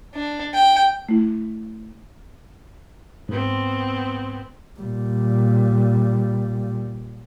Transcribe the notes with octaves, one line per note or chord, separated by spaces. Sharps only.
D4
G5
A3 E4
G#2 B3 C4
A#2 G3